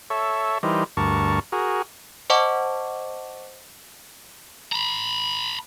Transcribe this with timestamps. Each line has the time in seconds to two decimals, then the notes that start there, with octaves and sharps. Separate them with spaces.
0.10 A4 C#5 E5
0.63 E3 G3 D#4 A#4 C5
0.97 D2 G2 A#4 A5 C#6
1.52 F#4 G#4 A#4
2.30 C5 D#5 F#5 A5 C#6 D6
4.72 A#5 B5